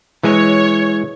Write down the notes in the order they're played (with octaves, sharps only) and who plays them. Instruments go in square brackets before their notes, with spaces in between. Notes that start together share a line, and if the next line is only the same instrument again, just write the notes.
[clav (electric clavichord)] E3 G#3 G#5 [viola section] C#5